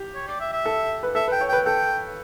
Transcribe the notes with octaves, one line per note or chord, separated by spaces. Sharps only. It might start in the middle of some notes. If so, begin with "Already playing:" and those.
Already playing: G4
C#5
D5
E5
E5
A4
B4
A4 E5
B4 G5
C#5
B4 G5
A4 G5